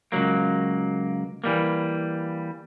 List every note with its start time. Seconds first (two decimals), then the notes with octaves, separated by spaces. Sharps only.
0.12 C#2 F#2 F#3 A#3
1.44 E3 G3 A#3